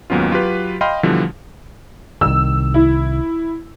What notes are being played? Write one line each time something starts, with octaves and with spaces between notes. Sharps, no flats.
D#2 G#2 F#3 B3 C#4 F4
F#3 F4 G4 B4
D#5 F5 G5 B5 C6 F6
B2 D3 E3 F3 G3
C2 D#3 E6
E4